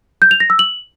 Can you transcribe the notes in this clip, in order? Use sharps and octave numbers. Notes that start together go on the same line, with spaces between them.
G6
F7
A#6
E6
F#7